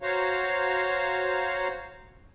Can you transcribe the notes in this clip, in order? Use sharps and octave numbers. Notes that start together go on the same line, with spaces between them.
F#4 C5 C#5 F5 A#5